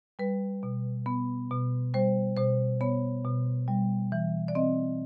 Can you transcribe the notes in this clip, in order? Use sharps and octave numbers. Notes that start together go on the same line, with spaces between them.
G3 B4
B2
B3
B2
G3 C5
B2 C5
B3 C#5
B2
G3
E3
D5
C4 D#5